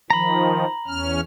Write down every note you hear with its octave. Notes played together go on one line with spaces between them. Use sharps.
D#3 F3 A#5 B5
E2 C#4 F6